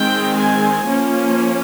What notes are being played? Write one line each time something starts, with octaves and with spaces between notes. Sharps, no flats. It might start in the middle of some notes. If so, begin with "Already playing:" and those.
Already playing: D#3 G#3 C4 G5
G#5
F3 A#3 C#4